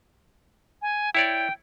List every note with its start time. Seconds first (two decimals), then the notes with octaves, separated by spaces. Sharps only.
0.82 G#5
1.15 E4 C#5 D5 G5